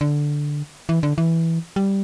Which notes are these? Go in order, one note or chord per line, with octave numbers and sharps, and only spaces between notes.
D3
E3
D3
E3
G3